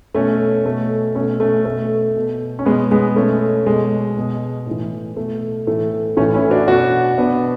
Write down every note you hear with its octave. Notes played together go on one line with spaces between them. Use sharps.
B2 A3 C#4
B2 A3
B2 A3 C#4
A3 C#4
B2 A3
B2
C#4
B2 G#3 B3
G#3 B3
B2 A3 C#4
B2 G#3
B2
A2 E3
B2 A3
A2 E3 A3
A2 E3 A3 C#4
C#4 E4
D4 F#4
B2 D4 F#4
B2 B3 D4